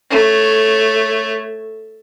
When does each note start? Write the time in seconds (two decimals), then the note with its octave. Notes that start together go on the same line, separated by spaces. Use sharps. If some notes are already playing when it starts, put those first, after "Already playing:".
0.10 A3 C#5